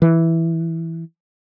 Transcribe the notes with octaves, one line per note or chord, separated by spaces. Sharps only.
E3